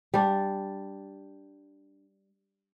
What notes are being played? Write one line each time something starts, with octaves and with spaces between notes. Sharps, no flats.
G3 D4